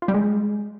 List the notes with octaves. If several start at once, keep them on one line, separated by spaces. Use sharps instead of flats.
F4
G3
G#3